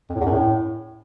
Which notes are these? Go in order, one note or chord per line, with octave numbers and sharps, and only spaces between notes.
F2
A2
E2
F#2
A2